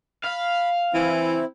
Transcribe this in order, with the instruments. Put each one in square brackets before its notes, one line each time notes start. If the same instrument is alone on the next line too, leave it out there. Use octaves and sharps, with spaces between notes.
[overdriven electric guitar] F5 [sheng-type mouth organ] B5
[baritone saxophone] E3 [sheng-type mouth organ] C4 E4